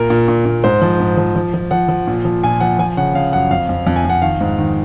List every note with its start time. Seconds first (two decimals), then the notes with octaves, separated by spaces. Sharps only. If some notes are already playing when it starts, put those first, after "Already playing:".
Already playing: A#2 A#4
0.10 A#2
0.28 A#2
0.45 A#2
0.64 G#2 C5
0.82 F3
1.00 G#2
1.17 F3
1.35 F3
1.54 F3
1.71 F3 F#5
1.89 F3
2.07 A#2
2.25 F3
2.44 A#2 G#5
2.60 F3 F#5
2.79 F3 G#5
2.97 C#3 F#5
3.14 C#3 F5
3.32 F#2 F#5
3.51 F2 F5
3.69 F2
3.87 F2
3.96 G#5
4.05 F2 F#5
4.22 D#3 F5
4.41 G#2
4.58 D#3